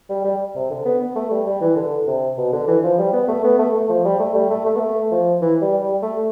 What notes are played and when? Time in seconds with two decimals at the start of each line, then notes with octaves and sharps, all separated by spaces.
0.09 G3
0.24 G3
0.55 C3
0.70 D3
0.85 B3
1.00 B3
1.16 A3
1.31 G3
1.46 G3
1.61 E3
1.76 D3
2.07 C3
2.37 B2
2.52 D3
2.67 E3
2.83 F3
2.98 G3
3.13 B3
3.28 A3
3.44 B3
3.59 A3
3.74 A3
3.89 F3
4.05 G3
4.19 A3
4.34 G3
4.50 A3
4.66 A3
4.76 B3
4.80 A3
5.11 F3
5.41 E3
5.62 G3
5.82 G3
6.02 A3